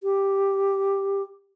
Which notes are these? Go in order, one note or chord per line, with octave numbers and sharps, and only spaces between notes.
G4